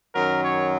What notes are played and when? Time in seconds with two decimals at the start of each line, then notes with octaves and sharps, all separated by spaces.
0.14 F#2 D#3 F#3 A#4
0.43 C#5